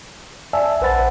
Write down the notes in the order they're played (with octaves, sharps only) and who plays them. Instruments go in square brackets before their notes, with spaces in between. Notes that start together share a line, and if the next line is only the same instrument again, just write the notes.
[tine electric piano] D5 E5 G#5 A5 E6
A#1 B4 C5 F#5 B5 A6